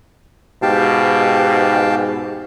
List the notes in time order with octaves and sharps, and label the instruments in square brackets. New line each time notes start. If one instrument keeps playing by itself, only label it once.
[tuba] G#2 [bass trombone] B2 [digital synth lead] G4 [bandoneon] F5 G5 A5